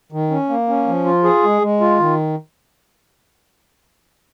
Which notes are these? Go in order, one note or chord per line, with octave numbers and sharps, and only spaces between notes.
D#3
C#4
A#3
C#4
F3
F4
G#4
G#3
G#3
F4
D#3